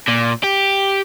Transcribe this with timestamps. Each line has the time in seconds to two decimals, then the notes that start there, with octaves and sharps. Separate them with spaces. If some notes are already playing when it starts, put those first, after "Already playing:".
0.08 A#2
0.44 G4